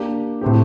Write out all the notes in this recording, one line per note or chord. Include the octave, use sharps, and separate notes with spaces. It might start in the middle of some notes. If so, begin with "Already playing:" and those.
Already playing: A#3 D4 G4
A2 A3 C4 G4